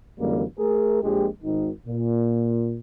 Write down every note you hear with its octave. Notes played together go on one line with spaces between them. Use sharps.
F#2 D3 E3 G3 G#3 A#3
A3 G#4 A#4
A#1 G#3 G4
G#1 D#3
A#2